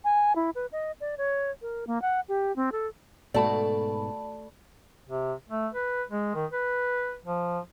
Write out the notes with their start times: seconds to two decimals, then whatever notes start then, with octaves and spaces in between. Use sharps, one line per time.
0.04 G#5
0.36 E4
0.55 B4
0.72 D#5
1.00 D5
1.18 C#5
1.62 A#4
1.87 A#3
2.02 F#5
2.28 G4
2.56 C4
2.72 A4
3.34 G#2 B2 A3 F#4 D5 A5 B5
5.07 C3
5.49 A3
5.74 B4
6.09 G#3
6.35 D#3
6.52 B4
7.25 F3